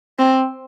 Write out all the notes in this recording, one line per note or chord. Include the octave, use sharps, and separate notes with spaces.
C4